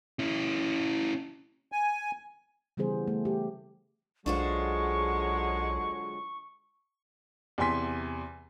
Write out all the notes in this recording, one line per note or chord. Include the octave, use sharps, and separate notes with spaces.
C#4 E4
G#5
C#3 E3 G3 B3 G#4 C5
A3
G4
B1 D3 F#3 G#3 D4 F4 C5 C#6
E2 C3 G#5 C6 B6